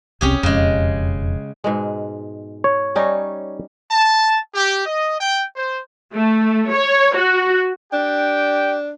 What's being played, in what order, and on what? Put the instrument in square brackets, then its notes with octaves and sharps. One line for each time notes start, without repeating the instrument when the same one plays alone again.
[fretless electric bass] E1 C2 C4 [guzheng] C#4 G4 G#4
[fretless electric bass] E1 F2 [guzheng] C#3 G#3
[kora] G#2 B2 G#3
[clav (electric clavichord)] C#5
[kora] G3 C#4 D#4
[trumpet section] A5
G4
D#5
G5
C5
[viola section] A3
C#5
F#4
[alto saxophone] D4 [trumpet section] G4 D5 G5